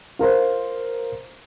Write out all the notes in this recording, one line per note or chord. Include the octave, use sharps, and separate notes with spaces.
F4 A#4 C5